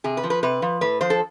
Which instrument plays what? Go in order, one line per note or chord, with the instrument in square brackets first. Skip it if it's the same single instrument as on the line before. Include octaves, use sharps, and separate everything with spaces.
[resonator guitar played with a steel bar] C3 G#4
B4
F3
B4
C3 B4
F3
A2 B4
F3 C5
A4